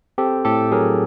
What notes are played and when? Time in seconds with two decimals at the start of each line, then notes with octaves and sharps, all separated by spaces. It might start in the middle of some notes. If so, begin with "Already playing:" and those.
0.18 C4 G4 A4
0.45 A2 G4 A4
0.72 F#3 G#4 A#4